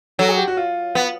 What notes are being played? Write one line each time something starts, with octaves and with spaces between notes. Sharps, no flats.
F#3 A4
G#4
G4
F#4
F4
B3